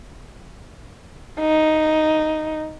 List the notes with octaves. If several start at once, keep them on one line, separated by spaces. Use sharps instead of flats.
D#4